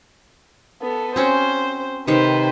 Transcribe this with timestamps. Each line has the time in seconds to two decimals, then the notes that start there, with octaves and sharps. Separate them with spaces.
0.82 B3 A4
1.16 C4 C#4 F#4 C5
2.08 C3 D#3 B4 C5